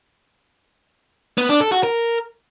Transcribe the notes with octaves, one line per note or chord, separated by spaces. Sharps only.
B3
D4
A4
F#4
A#4